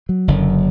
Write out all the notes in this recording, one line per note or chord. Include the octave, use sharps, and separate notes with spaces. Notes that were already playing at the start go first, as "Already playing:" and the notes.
F#3
F#1 F#2 D3